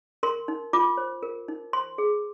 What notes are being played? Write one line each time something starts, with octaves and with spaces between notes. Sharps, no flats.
A#4 C6
D#4
F4 D6
C5
A#4
D#4
C5 C6
G#4